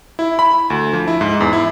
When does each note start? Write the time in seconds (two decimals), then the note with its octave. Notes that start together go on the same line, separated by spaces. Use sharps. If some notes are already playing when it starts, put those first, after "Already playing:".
0.19 E4
0.39 B5
0.70 D2
0.93 F3
1.08 E4
1.21 G#2
1.41 E2
1.53 E4